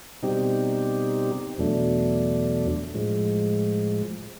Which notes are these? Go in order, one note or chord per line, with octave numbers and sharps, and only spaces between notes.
B2 G3 C4 D#4 G4
E2 B2 F#3 A3 D4
A2 F3 G#3